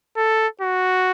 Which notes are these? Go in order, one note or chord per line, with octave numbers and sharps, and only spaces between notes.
A4
F#4